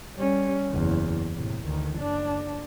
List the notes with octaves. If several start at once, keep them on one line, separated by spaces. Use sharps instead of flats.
G3 C#4
F#1 E2
A2 C3
D2 D#3
F#1 D4